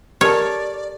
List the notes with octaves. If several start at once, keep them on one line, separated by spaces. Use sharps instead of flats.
G4 A4 A#4 C#5 D5 A5